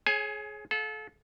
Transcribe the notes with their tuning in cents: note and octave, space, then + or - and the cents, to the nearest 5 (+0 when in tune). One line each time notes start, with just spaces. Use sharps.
G#4 +25 C#5 -25 G#5 +0
A4 -30 F5 +25